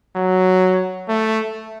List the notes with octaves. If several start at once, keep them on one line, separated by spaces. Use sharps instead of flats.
F#3
A3